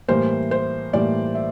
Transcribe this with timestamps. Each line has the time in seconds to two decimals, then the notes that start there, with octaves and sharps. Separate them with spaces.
0.08 A2 E3 G3 A#3 C5
0.51 C5
0.93 A2 E3 G3 A#3 D5
1.35 E5